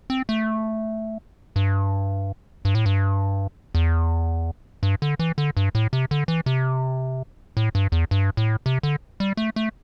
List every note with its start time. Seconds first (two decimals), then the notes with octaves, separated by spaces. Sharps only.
0.10 C4
0.29 A3
1.56 G2
2.65 G2
2.75 A2
2.86 G2
3.75 E2
4.83 G2
5.02 D3
5.20 E3
5.38 D3
5.57 G2
5.75 A2
5.93 C3
6.11 D3
6.28 E3
6.46 C3
7.57 A2
7.75 G2
7.92 E2
8.11 G2
8.37 A2
8.66 C3
8.83 D3
9.20 G3
9.37 A3
9.56 A3